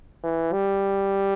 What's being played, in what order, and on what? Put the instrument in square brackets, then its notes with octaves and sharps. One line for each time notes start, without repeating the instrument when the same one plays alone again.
[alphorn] E3
G3